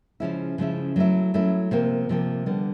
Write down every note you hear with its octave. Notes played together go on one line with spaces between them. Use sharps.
C#3 F3 G#3 C#4 E4
C#3 F3 G#3 C#4 E4
F#3 A3 C#4 E4
F#3 A3 C#4 E4
C3 F3 A#3
C3 F3 A#3
D3 G3 B3